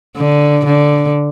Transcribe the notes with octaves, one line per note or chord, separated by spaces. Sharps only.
D3
D3